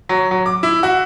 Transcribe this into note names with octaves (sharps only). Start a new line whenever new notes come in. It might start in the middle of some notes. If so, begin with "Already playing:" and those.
F#3
F#3
D6
E4
F#4